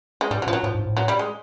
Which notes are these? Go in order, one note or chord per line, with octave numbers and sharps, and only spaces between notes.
G#3
A2 G3
F#3
A#2 F3
F#3
A2 F3
G#2
A2
F#3
G3
G#3